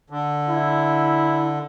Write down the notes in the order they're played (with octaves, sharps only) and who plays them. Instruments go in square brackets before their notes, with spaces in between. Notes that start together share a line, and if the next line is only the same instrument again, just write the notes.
[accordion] D3
[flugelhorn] E4